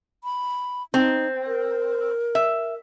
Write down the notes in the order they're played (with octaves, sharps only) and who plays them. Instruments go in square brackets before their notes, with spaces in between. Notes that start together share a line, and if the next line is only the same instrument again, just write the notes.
[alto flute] B5
[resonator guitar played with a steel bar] C4 [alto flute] D#4
[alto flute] A#4
[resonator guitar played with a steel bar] E5